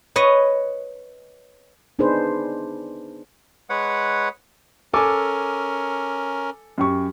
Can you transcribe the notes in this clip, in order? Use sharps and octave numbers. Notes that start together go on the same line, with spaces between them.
B4 C#5 D#5
B3 D4 D#4 G#4 B4 C5
G#3 B4 C#5 F#5
C#4 A4 A#4 G#5 D6
F#2 G4 C#6